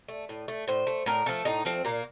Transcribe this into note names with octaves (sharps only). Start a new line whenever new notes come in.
A3
A2
A3
A2 C5
A3
A2 A#4
F3 A3 A4
A2 D#4
F3 A3 C4
A#2 A#3